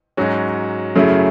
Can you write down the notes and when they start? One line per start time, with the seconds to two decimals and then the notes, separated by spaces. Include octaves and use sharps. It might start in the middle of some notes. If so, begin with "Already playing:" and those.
0.17 G#2 F#3 C#4 F#4
0.95 F#2 C#3 F#3 A3 E4